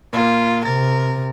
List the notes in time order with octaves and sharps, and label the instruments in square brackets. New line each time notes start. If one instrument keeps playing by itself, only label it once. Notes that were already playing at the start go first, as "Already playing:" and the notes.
[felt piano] A#2 A#3 [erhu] F4
[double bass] C3 [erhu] A#4 [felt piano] A6